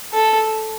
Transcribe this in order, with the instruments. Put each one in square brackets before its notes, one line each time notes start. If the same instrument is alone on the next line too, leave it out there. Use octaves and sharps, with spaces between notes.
[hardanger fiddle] A4